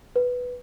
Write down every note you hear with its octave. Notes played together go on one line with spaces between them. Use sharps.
B4